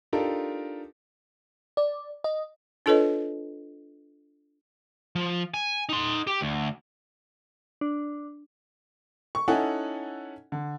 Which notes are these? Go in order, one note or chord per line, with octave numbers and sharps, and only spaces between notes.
D4 D#4 F4 G4 A4 A#4
D5
D#5
D4 F4 A4 B4 C#5 D#5
F3
G#5
D#4 C6
G4
D2
D4
C#6
C#4 D#4 E4 A4 F#5 G#5
D3